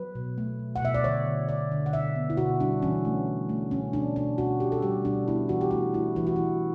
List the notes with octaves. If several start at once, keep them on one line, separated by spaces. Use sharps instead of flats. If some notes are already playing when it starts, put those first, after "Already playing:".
Already playing: F#3 B4
B2
A3
B2
F#5
B2 E5
D5
D3 C#5
D3
D3 D5
D3
F#5
B2 E5
B3
E4
B2 F#4
G3 D4
E3 C#4
A3
E3
A3
B2 C#4
B2 D4
B2 D4
B2 F#4
B2 G4
A4
G3 G4
B2 D4
B3 E4
E3 F#4
G4
A3 F#4
A3 E4
E3 E4
F#4
E3 E4